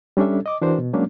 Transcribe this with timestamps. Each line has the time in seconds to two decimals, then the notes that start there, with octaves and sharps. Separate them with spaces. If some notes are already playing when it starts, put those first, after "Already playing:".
0.17 G3 C#4 D4 A4 E5
0.46 D#5 D6
0.62 E3 D4 F#4 A#4 C5
0.78 B2
0.93 F#3 G#3 A#3 C#4 D4